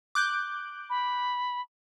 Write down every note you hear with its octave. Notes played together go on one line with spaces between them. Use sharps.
D6 F#6 G6
B5